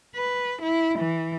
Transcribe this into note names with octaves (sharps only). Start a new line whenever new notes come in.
B4
E4
E3